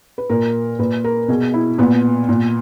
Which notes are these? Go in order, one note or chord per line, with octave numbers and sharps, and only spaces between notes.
B4
A#2 A#4
A#2 B4
A#4
B2 G#4
E4
A#2 B3
A#2